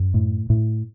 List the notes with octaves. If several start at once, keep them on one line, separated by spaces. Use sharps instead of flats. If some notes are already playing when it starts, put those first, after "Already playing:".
Already playing: F#2
A2
A2